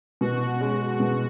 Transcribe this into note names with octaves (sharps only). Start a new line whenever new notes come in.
B2 F#4
G#3 C#4
B2